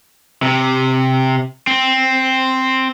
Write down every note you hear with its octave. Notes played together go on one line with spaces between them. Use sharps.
C3
C4